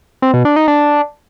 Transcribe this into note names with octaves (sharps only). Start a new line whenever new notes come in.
C4
B2
D4
D#4
D4